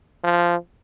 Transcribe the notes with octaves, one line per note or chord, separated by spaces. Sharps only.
F3